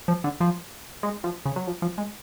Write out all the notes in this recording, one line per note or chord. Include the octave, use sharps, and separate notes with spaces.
F3
D3
F3
G#3
F3
C#3
F#3
F3
F3
G#3